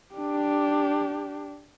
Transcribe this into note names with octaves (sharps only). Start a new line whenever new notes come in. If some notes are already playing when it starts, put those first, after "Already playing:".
D4 G4